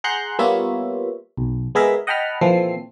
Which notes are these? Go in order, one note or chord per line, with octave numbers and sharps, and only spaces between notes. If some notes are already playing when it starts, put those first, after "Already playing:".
G#4 F#5 A#5 C6 F#6 G6
G3 A#3 B3 F4 C#5 E5
B1
G#3 B3 G#4 A#4 E5
D#5 F#5 G5 A5 B5 F6
A#2 E3 F3 C4 A4 C7